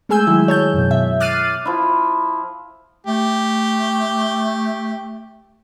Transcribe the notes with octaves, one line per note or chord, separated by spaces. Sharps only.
G#3 A3 G#4 G#5 E6 G6
D#3 F#3 G#3 E4
C#5 A5 G6
F#2 B2
E5
D6 F6 F#6 A6 C7 D#7
F3 E4
A3 G4